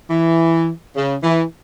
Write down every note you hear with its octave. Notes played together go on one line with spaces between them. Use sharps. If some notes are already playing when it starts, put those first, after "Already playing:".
E3
C#3
E3